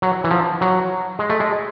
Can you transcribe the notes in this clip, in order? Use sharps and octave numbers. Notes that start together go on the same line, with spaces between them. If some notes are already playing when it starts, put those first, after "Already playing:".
F#3
E3
F3
F#3
G#3
A3
G#3